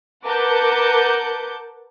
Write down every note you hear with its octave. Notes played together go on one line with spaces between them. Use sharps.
A#4 B4 F#5 A5 D6 G6